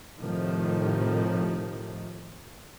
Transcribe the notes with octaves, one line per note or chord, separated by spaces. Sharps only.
A2 C3 D#3 F3